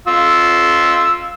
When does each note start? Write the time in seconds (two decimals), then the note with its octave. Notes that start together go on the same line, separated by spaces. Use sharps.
0.08 F4 E6